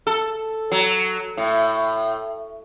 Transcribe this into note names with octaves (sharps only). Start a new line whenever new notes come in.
A4
F#3
A2